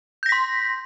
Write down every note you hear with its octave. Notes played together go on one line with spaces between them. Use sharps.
C6 G6 A#6 B6